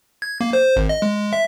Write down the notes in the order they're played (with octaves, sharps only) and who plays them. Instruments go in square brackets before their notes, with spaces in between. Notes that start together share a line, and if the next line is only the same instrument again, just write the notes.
[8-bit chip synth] G#6
A#3
C5
G#1
D#5
G#3
E5